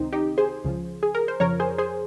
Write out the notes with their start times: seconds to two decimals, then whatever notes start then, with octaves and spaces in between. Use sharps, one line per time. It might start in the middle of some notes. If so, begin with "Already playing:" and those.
Already playing: C#2 C3 D#3 C4 D#4
0.12 D#4 G4
0.38 G#4 C5
0.64 C#2 C#3 F3
1.03 G#4
1.15 A#4
1.28 C5
1.40 F2 C#3 F3 A#4 C#5
1.60 G#4 C5
1.78 G#4 C5